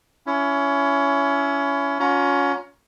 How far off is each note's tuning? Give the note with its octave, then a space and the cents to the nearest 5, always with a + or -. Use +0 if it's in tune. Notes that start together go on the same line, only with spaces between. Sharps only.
C#4 +20 E4 +20
C#4 +20 F4 +45 A#5 +30